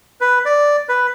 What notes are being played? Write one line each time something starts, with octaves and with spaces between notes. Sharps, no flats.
B4
D5
B4